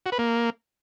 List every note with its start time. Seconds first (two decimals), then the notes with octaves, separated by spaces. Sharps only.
0.06 F#4
0.12 B4
0.19 A#3